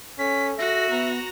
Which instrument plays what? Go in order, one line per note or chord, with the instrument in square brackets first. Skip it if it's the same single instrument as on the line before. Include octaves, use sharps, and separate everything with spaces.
[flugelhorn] C#4 [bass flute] A4 [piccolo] B6
[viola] F#4 [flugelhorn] E5 [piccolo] A#6
[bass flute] B3 [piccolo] A#5